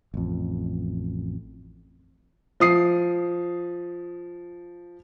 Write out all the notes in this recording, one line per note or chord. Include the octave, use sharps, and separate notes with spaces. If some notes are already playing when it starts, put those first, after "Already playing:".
A1 F2
F3 D#6 C7